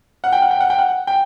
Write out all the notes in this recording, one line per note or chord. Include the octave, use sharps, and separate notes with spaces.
F#5
G5
F#5
G5
F#5
G5
F#5
G5